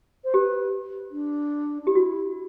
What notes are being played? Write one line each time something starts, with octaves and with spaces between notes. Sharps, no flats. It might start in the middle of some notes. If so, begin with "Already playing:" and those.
C5
G4 B4
D4
D4
E4 G4
F#4